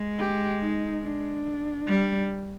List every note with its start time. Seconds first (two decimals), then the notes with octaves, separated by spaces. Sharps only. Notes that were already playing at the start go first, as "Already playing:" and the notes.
Already playing: G#3
0.19 G4
0.61 D#4
1.03 D4
1.88 G3